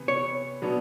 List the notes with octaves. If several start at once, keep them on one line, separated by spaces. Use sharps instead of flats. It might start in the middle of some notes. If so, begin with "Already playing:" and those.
Already playing: C3 E3 B3
C#5
B2 F#3 B3 D4